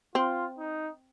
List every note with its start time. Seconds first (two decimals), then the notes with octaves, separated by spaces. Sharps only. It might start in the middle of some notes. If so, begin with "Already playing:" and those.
0.15 C4 F4
0.58 D#4